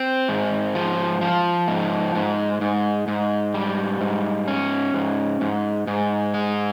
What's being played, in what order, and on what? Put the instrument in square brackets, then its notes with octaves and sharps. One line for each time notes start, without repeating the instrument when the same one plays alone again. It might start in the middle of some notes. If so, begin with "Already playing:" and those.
Already playing: [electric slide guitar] C4
G#2
F3
F3
G#2
G#2
G#2
G#2
G3
G#2
C#4
G#2
G#2
G#2
G#3